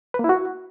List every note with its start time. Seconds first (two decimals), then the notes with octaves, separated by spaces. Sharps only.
0.14 B4
0.19 A#3
0.24 E4
0.29 F#4